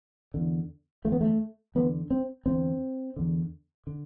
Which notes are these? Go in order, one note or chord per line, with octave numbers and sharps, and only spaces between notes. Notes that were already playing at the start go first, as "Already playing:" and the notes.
E2 D3
E2 D3 A3 B3
A3
E2 D3 B3
C4
E2 D3 C4
E2 D3
D3